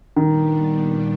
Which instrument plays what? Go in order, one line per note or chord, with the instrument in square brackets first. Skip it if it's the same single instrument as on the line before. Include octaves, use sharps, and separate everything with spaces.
[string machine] A#2 G3 B3 D4 [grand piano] D#3